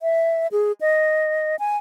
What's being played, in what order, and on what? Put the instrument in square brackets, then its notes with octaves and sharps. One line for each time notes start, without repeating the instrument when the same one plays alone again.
[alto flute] E5
G#4
D#5
G#5